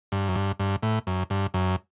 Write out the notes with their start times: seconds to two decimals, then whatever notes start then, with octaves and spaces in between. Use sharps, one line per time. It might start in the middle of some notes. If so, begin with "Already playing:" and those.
0.12 G2
0.29 F#2
0.36 G2
0.60 G2
0.83 A2
1.07 F#2
1.30 G2
1.54 F#2